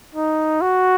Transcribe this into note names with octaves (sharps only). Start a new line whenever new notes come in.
D#4
F#4